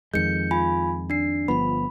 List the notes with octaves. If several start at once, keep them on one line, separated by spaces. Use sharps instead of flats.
F2 D#3 G#3 G6 C#7
F4 G#5 B5
D4 C7
G1 F3 B3 B5